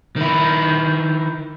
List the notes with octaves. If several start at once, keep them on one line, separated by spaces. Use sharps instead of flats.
D#3 E4